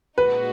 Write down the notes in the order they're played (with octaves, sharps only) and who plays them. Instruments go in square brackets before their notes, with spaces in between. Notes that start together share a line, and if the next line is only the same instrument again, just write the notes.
[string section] A#2 G#3 D#4 F#4 [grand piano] B4